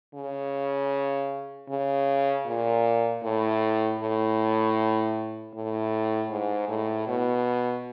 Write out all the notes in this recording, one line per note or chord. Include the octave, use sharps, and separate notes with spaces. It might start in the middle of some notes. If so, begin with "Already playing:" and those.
C#3
C#3
A#2
A2
A2
A2
G#2
A2
B2